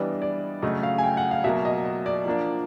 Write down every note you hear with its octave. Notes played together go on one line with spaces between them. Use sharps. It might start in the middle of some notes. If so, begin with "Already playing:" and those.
Already playing: E3 G3 B3 D4 D#5
D5
C#3 F#3 A3 D#5
F5
G#5
G5
F#5
F5
B2 F#3 A#3 E5
D#5
D#5
D5
F3 A#3 D4